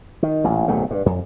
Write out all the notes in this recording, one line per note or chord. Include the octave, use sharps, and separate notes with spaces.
D#3
A1 A#2
D1 B1 A#2 A3
G2
F2